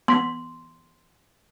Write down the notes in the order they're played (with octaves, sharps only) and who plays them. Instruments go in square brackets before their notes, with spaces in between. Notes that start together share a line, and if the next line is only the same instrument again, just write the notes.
[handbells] B3 B6 [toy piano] C6